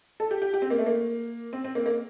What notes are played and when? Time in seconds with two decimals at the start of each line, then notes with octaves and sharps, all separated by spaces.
0.20 A4
0.31 G4
0.42 G4
0.54 G4
0.62 C4
0.70 A#3
0.78 A3
0.86 A#3
1.53 C4
1.64 C4
1.75 A#3
1.86 A#3